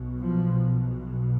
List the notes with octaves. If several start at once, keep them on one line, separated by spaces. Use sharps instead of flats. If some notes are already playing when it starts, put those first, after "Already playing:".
Already playing: B1 B2
F3